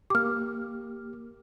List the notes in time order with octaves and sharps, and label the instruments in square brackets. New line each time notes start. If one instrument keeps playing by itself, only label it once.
[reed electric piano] A#3 G4 [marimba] D6 F6